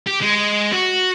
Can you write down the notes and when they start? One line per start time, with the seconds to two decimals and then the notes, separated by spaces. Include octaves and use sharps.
0.07 G4
0.22 G#3
0.73 F#4